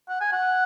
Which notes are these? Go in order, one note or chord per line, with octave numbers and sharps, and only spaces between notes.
F#5
G#5
F#5